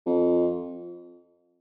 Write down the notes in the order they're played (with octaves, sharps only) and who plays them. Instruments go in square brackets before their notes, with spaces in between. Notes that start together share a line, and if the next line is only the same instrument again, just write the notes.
[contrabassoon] F2